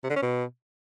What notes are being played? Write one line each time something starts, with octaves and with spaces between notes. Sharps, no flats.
C3
D3
C#4
B2